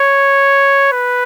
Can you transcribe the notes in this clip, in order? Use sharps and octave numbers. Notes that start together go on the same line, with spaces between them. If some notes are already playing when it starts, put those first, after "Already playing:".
Already playing: C#5
B4